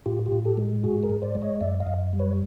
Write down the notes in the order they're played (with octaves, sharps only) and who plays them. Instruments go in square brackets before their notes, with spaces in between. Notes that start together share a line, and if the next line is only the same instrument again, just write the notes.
[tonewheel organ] A2 F4 G4
F4 G4
A2
G4 A4
G#3
G#2 F#4 G#4
G#4 A#4
G#2
C5 D5
G#3
C#5 D#5
F#2 D5 E5
D#5 F5
F#2
G3
B4 C#5